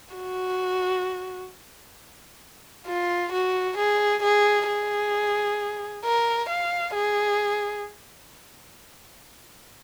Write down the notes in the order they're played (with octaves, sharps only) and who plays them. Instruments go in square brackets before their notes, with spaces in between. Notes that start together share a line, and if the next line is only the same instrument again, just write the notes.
[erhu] F#4
F4
F#4
G#4
G#4
G#4
A#4
F5
G#4